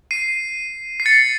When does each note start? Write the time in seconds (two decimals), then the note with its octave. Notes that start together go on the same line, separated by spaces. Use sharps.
0.11 C7 D#7
1.00 C7
1.06 A6 C#7